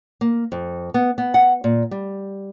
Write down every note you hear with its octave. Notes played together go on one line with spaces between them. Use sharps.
A#3
F2
B3
B3
F#5
A#2
G3